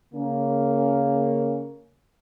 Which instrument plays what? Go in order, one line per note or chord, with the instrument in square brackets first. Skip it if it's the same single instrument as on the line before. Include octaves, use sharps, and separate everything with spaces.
[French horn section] C#3 A#3 C#4